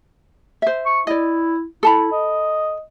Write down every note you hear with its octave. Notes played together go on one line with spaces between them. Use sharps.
C5 E5
C#6
E4 D5 D#5
E4 A4 A5 B5
D#5